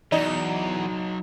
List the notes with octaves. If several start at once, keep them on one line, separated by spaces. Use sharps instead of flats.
E2 F#3 D#4 D5 D#5